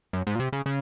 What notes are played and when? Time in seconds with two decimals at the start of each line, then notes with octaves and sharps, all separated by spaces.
0.13 F#2
0.27 G#2
0.35 A#2
0.40 C3
0.53 C#3
0.66 C#3